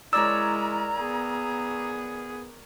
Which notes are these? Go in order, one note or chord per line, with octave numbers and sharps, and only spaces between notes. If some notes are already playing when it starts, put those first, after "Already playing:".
G#3 E4 A#4 C#5 D5 A#5 E6
B3 G#4